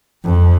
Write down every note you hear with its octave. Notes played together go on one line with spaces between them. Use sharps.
F2